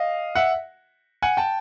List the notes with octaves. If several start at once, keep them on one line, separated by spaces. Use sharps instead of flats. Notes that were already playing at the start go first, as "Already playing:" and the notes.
Already playing: D#5 F5
E5 F#5
F#5 G#5
G5 A5